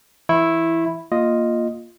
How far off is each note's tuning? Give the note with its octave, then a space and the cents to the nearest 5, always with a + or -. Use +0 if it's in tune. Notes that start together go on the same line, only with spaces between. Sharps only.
E3 +15 E4 +0 C#6 -40
A#3 +0 F4 +0 D#5 +0